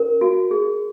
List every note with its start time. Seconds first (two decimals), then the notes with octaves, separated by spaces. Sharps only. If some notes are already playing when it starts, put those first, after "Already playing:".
Already playing: C#4 A#4
0.21 F#4
0.51 G#4